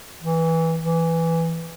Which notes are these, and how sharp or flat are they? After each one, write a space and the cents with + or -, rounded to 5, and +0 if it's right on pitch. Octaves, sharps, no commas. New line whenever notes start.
E3 -10
E3 +5